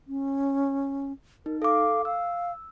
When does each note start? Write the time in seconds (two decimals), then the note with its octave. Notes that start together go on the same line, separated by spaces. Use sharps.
0.08 C#4
1.46 D#4 A#4
1.62 A4 F5 D6
2.05 F5 E6